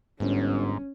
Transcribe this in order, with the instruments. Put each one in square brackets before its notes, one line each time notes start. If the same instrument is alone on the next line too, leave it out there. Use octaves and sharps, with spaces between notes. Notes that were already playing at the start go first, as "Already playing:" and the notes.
[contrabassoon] G1 [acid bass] G#2 [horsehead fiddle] C#4